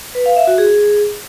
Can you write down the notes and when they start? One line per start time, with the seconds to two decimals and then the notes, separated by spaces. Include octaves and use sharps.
0.15 B4
0.26 F5
0.37 E5
0.47 F#4
0.58 G#4